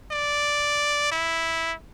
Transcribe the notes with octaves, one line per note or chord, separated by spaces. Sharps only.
D5
E4